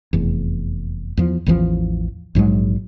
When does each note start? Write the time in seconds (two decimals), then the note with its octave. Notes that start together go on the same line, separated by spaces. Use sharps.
0.13 F1 E2
1.17 E2 F3
1.46 A1 E2 E3 F3
2.35 A#1 G#2 F#3 G#3